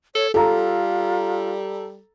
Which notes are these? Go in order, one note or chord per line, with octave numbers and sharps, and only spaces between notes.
A4 C#5
G3 F4 A4 A#5